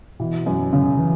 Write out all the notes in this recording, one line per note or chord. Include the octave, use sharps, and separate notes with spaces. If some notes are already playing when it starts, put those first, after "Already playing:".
B2 E3
F#2
C#3
E3